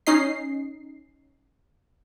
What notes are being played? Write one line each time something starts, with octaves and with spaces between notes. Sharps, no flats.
C#4 D#4 D#5 C7